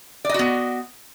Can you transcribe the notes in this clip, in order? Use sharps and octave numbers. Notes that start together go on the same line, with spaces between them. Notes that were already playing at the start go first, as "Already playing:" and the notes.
B3 F#4 D5 D#5